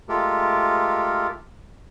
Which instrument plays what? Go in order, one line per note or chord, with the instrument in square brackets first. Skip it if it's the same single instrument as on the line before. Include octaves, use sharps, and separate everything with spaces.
[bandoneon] G#3 A3 F4 G4 A4 A#4